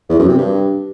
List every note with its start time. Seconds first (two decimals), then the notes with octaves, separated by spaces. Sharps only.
0.09 E2
0.19 F#2
0.28 C3
0.38 G2